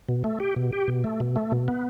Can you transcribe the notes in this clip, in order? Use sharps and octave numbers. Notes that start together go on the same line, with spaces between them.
B2
A3
G4
B2
G4
B2
A3
B2
A3
B2
B3